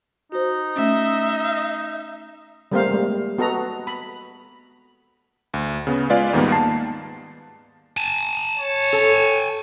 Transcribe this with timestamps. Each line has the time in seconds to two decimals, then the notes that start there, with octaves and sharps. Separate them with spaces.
0.32 D#4 F#4 C5
0.76 A3 C#4 E5
2.71 G3 A3 A#3 C4 C5 F5
2.91 G3 G#3
3.38 B3 F#4 A4 B4 D#5 A#5
3.87 B5
5.54 D2
5.87 C#3 B3
6.10 G#3 F4 B4 D5 F5 G#5
6.33 D#2 G#2 D#3 G3 A#3 B3
6.52 A5 C7
7.97 G#5 A5
8.57 C#5
8.93 A4